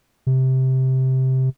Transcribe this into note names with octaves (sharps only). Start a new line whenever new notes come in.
C3